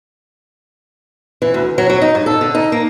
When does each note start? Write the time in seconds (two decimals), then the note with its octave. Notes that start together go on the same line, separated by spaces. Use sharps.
1.42 E3
1.54 D2
1.78 F#3
1.90 F#3
2.02 D#4
2.15 G2
2.26 A4
2.41 D3
2.55 D#4
2.72 A#3